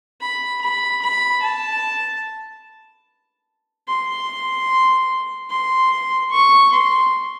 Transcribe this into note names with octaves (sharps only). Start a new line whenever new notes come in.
B5
B5
B5
A5
C6
C6
C#6
C6